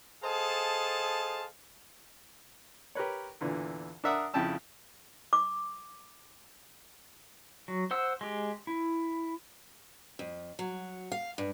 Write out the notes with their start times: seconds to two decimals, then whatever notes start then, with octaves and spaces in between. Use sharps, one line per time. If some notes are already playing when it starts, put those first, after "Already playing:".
0.24 G#4 A4 C5 D#5 F5 A5
2.95 G4 A#4 B4 C#5
3.41 E2 A#2 D3 E3
4.04 D4 A#4 E5 F#5 D#6
4.34 F2 C#3 E4 G5 A5 E6
5.33 D6
7.68 F#3
7.91 C5 F#5 E6
8.21 G#3 G4
8.67 E4
10.19 F2
10.59 F#3
11.12 F5
11.38 G2